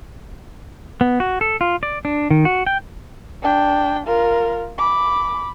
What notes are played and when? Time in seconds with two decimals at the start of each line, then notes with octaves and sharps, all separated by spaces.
1.01 B3
1.20 F#4
1.41 A4
1.61 F4
1.83 D5
2.05 D4
2.31 D#3
2.45 F#4
2.66 G5
3.43 D4 G5
4.07 F4 A#4
4.78 B5 D6